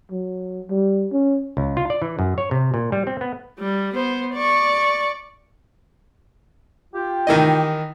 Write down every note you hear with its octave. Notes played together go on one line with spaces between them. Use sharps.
F#3
G3
C#4
C#2
F4
D5
E3
F#2
C#5
C3
A#2
G3
C4
B3
G3
B3 C5
D5 C#6
F4 G4 G5
D#3 E3 D#5